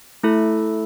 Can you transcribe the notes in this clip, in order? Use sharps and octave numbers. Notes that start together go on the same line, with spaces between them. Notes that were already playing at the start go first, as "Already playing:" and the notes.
A3 E4 A4